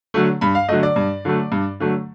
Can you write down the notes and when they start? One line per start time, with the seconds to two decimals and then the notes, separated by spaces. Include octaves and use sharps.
0.14 D3 F#3 A3
0.41 G2 B5
0.55 F5
0.69 D3 F#3 A3 D#5
0.83 D5
0.96 G2
1.25 D3 F#3 A3
1.52 G2
1.80 D3 F#3 A3